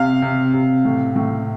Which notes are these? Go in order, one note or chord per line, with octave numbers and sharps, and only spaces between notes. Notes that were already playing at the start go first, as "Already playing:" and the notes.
Already playing: C3 F5
C3
C3
A2
A2